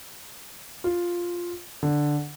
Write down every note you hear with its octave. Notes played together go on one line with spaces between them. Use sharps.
F4
D3